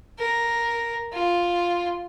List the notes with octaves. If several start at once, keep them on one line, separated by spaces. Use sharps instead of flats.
A#4
F4